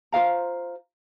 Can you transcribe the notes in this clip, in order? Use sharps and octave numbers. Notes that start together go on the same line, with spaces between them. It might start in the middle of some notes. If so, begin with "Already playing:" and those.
F4 C5 F5 A#5